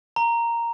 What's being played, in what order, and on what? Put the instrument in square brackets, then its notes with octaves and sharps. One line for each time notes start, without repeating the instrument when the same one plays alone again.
[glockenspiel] A#5